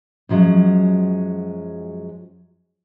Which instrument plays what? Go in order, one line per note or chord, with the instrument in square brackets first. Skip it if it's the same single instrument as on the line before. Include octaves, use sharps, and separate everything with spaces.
[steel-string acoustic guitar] F#2 F3 F#3 G#3